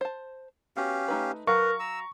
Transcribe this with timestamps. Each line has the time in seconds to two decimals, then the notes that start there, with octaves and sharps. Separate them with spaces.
0.01 C5 A5
0.77 B3 C#4 F#4 G4 F5
1.08 A3 D#4 B4
1.47 F#3 A#4 B4 F5 C#6
1.80 A#5 E6